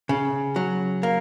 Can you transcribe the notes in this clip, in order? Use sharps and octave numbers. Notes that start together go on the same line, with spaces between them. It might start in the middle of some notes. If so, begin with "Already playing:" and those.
C#3
F#3
A#3